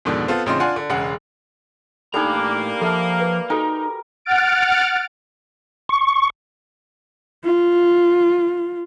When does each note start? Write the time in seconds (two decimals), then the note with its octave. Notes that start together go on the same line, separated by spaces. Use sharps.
0.05 F2 G#2 B2 D3 D#3
0.28 B3 C4 F4 A4 C5
0.46 A1 C#3 C4 D#4 F4 C6
0.60 D4 F4 F#5 G#5 C6
0.76 D3
0.90 E1 C#3 G#3 F#5
2.14 A2 G3 A#3 D4 D#4 A4 G#5 A#5
2.81 F3 A4 E5 A5 C#6
3.20 B4
3.50 D#4 F#4 A4 A#4 G#5
4.25 F#5 F6 A6 D7
5.89 C#6
7.45 F4